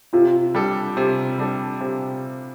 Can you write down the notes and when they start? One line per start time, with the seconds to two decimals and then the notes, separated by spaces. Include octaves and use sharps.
0.13 C3 F4
0.55 G3 D4 A4
0.97 C3
1.38 G3 D4 A4
1.81 C3